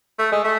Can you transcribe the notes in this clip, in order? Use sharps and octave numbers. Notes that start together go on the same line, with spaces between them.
A3
G#3
A3